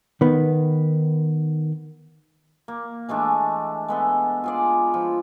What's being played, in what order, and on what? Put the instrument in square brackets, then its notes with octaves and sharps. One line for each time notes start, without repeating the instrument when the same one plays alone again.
[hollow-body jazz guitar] D#3 B3
[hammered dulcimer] A#3
E3 G#3 A3 D4
G#3 B3 A4
F4 G#4 D5
F3